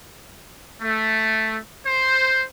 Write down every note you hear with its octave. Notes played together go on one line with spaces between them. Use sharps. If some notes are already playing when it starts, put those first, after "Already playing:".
A3
C5